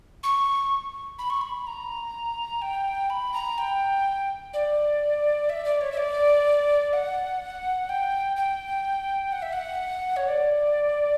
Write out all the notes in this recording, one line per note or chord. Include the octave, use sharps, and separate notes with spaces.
C#6
B5
C#6
B5
A#5
G5
B5
A#5
G5
D5
E5
D5
C#5
E5
D5
F#5
G5
G5
F#5
E5
F#5
C#5
D5